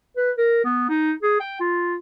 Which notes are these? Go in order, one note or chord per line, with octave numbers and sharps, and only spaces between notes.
B4
A#4
B3
D#4
G#4
G5
F4